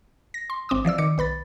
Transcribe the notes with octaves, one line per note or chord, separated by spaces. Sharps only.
A#6
C6
G#1 C4 D6 D#6
E3 F3 D5 E6
D#3 D6 C#7
B1 B4 B5 A6